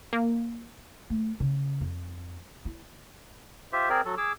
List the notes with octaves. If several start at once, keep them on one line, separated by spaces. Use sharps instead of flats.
A#3
A3
C#3
F2
E4
F4 G4 C5 E5
C4 G#4 A#4 D5
F#3 A4
G#4 D6 E6